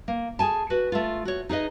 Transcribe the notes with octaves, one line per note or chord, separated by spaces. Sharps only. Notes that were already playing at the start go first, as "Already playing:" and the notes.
A#3
G#4 A4 G#5 A5
F#4 B4
A3 F4
F#4 C#5
D#4 G#4 B4 D#5